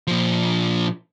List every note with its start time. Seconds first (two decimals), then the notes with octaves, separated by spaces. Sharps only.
0.07 A#2 F3